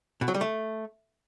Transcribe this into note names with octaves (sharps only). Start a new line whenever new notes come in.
B2
F#3
G3
A3